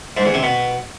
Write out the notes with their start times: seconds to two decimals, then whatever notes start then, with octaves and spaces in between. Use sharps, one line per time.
0.17 G#2
0.25 E2
0.34 C3
0.43 B2